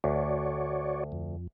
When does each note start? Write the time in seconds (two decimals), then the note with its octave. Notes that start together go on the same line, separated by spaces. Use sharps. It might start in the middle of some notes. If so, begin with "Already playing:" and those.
0.04 D2 F#4 C#5 D5
1.12 F2